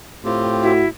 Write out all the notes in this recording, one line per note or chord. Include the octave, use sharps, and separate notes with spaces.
A2 C4 F4 G4
E4 F#4